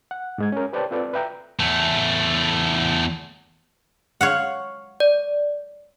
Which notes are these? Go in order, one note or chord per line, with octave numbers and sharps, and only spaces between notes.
F#5
G#2 G#3 G#6
C#4 A#4
G4 B4 C5 D5 G5 A5
C4 F4 A4 B4 D5
B4 E5 G5 A#5
E2 A3
C#5 F5 F#5
D5